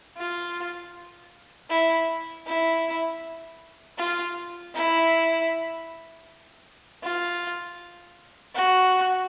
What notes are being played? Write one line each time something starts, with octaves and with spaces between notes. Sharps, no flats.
F4
E4
E4
F4
E4
F4
F#4